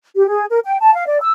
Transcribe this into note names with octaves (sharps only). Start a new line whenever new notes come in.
G4
G#4
A#4
G5
A5
F5
D5
E6